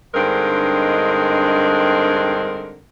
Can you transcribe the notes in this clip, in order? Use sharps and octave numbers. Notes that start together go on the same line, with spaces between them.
G2 D3 G#3 C4 D#4 A#4